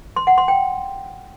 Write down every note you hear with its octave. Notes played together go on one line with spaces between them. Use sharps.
C6
F#5
C6
G5